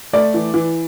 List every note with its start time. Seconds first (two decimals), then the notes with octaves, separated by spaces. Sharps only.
0.13 A3 D5
0.34 E3
0.54 E3